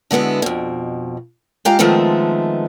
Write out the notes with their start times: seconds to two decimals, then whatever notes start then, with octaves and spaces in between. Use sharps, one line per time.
0.11 D3 G#3 B3 E4 F#4
0.42 F2 B2
1.65 G#3 F4 G4 F5 A#5
1.79 D#3 F3 G#3 A3 B3 C4